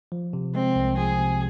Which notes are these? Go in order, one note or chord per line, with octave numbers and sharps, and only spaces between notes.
F3
C3
G#3 C4
C2
F3 G#4
C3